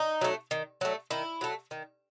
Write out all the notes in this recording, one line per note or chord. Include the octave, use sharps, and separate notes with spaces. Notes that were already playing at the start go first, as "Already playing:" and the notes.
Already playing: D#4
F#3 A3
D#3
F#3 A3
D#3 E4
F#3 A3
D#3